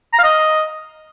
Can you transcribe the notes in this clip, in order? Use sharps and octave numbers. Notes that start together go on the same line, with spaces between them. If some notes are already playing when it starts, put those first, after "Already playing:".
A#5
F5
D#5